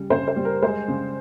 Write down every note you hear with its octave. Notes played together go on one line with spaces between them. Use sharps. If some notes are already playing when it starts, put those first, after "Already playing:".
Already playing: C#3 G3
C#3 C5
C5
G3
A#4
G#3 C5
C#3